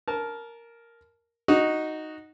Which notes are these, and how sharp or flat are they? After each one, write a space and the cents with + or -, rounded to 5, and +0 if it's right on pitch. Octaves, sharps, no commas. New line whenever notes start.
A#4 +0 A5 -25
D#4 +0 F#4 +0